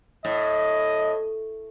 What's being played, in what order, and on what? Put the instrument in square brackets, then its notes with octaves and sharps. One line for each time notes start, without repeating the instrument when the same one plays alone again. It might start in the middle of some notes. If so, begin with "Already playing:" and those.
[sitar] A2 [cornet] D#5